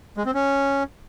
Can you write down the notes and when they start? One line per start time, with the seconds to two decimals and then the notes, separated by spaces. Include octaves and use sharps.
0.17 G#3
0.26 C4
0.34 C#4